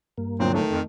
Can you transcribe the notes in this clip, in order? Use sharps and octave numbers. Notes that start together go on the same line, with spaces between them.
G2 A#3
D2 A#2 F#3 C4
D#3 A3
F2